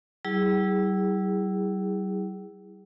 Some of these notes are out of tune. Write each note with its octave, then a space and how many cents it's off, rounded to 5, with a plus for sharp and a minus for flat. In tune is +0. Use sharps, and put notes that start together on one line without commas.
G3 -45 E4 +0 G#4 -20